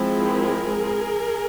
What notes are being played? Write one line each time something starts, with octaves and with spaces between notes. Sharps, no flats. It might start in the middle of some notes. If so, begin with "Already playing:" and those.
Already playing: F3 G#3 C4 E4
G#4 A#4